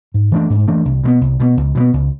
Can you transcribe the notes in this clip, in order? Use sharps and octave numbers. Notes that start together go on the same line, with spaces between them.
G#2
E3 A3 D4
G#2
E3 A3 D4
C2
B2 G#3 B3
C2
B2 G#3 B3
C#2
B2 F#3 B3
C#2